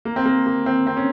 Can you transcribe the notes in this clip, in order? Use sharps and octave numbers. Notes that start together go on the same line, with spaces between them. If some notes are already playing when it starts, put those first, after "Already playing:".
A#3
C4
A#3
A#3
C4
C4
C#4